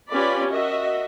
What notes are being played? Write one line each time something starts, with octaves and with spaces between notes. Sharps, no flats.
C#4 F4 G4 B4 D5 B5
F#4 A#4 D#5 E5